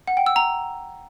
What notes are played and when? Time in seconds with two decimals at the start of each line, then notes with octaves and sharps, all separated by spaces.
0.07 F#5
0.17 G5
0.26 E6
0.36 A#5